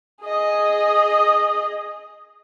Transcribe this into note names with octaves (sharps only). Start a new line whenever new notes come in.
G#4 D#5